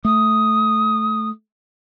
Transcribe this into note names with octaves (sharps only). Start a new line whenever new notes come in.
A3 D#6